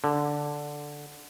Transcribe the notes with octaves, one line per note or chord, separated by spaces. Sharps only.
D3